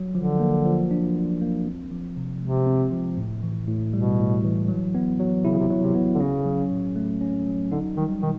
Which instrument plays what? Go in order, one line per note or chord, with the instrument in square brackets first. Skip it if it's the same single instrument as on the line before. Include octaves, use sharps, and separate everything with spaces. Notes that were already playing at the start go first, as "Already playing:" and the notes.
Already playing: [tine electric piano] F#3
[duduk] D3 [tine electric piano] F3
[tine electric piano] A#3
F3
D4
F3
A#3
C4
F3
C3
[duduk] C3 [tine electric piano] G#3
[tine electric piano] C4
F3
A2
E3
A2
[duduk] B2 [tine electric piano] G3
[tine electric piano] A2
E3
F#3
B3
F#3
[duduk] C3 [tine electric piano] E4
[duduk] C#3
C3
[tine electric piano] F#3
[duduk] C3
[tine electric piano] B3
[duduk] D3
[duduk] C#3 [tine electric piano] C#4
[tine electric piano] F#3
A2
A3
C#4
F#3
[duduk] D3 [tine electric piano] D#4
[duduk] D#3 [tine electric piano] G3
[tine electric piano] B2 [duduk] D#3